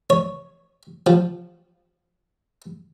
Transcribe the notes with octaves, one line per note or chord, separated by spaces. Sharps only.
C#5
F3